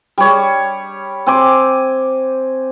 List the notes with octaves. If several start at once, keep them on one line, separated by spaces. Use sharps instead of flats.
G3 C#5
C4 G#5 D6